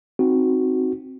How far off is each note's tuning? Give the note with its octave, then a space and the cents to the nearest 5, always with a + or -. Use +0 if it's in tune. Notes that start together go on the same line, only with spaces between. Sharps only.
C4 +0 D#4 +0 F#4 +0